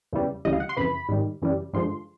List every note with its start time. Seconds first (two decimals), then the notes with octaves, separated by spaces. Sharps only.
0.13 E2 C#3 E3 G3
0.45 D2 C#3 E3 G3 D#5
0.53 F5
0.60 F#5
0.69 C6
0.76 F2 C#3 E3 B5
1.09 G#2 D#3 G3
1.42 F#2 C#3 E3 G3
1.73 G2 D3 F3 G#3 C6